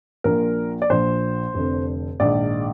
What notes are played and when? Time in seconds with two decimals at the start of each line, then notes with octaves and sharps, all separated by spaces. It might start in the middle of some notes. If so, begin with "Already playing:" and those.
0.24 A#1 A#2 F3 A#4
0.82 D5
0.90 A#1 A#2 F3 C5
1.54 F1 F2 D3
2.20 A#1 G#2 D#3 D5